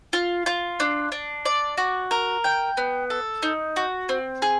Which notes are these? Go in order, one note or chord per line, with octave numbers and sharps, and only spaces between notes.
F4
F4
D4
D4
D5
F#4
A#4
G5
B3
A4
D#4
F#4
C4
G#4